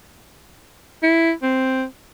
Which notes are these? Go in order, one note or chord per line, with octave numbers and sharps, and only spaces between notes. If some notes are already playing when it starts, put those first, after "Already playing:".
E4
C4